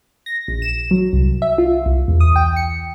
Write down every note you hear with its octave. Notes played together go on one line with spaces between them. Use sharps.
A#6
A#1
E7
F#3
C2
E5
F4
C2
E2
D#6
G5
C#7